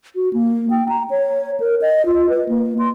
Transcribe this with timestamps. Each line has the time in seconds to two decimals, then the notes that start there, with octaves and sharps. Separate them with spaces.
0.16 F#4
0.33 A#3
0.70 G5
0.89 A#5
1.10 C#5
1.60 A#4
1.82 D#5
2.06 F4
2.29 B4
2.49 A#3
2.79 C6